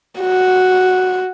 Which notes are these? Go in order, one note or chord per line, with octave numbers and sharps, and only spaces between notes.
F#4